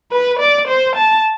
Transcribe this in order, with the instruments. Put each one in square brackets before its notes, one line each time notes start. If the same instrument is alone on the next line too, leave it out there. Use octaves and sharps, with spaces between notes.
[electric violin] B4
D5
C5
A5